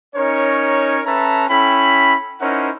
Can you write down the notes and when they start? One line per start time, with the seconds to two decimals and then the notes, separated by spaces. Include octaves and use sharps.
0.16 C#4 D#4 A#4 C#5
1.06 C#4 A4 B4 E5 A5 A#5
1.50 C#4 E4 A4 G5 B5
2.40 C#4 D#4 E4 A#4 C5 F#5